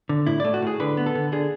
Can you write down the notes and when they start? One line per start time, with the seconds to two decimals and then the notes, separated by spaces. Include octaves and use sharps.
0.09 D3
0.26 A2 E4
0.40 A3 D5
0.54 F#4
0.62 A2 G#4
0.80 D3 B4
0.97 B3
1.06 A4
1.15 D3
1.32 D3 G#4